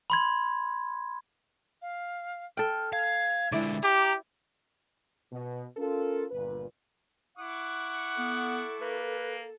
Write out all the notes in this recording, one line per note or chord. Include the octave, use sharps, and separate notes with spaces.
B5 C6 G#6
F5
A4 G5 F6
F5 G#6
D3 G#3 E4 D5
G4 A#5 D6
B2
C#4 F4 A4 A#4
G1 A#2 B4
E4 F#5 C#6 D6
B3 A4
A#3 B4